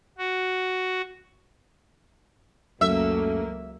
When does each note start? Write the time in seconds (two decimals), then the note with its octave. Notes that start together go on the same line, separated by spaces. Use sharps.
0.18 F#4
2.81 C#2 F#2 F#3 A3 A#3 E5